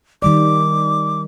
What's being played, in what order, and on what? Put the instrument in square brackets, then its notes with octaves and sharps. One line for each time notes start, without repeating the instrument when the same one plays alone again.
[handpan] D#3 G3 D5 [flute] D6